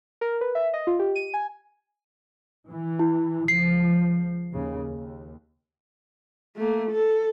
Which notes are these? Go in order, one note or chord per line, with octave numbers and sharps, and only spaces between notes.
A#4
B4
E5
D#5
F4
G4
D#7
G#5
E3
E4
C#2 F3 C7
D#2 C#3
D#2
A3 A#3
A4